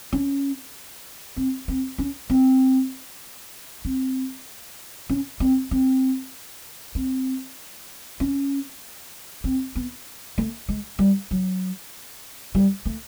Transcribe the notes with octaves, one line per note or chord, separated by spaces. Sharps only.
C#4
C4
C4
C#4
C4
C4
C#4
C4
C4
C4
C#4
C4
B3
A3
G#3
G3
F#3
G3
A3